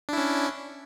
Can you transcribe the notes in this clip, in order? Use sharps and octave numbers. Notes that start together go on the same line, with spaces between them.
C#4 D4 E4